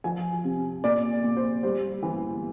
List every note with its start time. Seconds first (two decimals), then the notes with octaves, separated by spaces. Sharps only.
0.04 F3 G#5
0.44 C3
0.84 A#2 D5
1.24 A#2
1.37 C5
1.63 G3 C5
2.03 E3